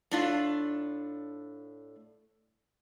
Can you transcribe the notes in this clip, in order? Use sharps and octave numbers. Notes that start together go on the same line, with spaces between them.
A2 D4 F4